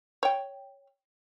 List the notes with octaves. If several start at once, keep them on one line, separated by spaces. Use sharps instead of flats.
C#5 G5